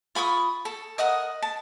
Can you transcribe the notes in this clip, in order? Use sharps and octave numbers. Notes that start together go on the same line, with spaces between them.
F4 B5 C#6 D#6
A4
A#4 D#5 F#5 D#6
A5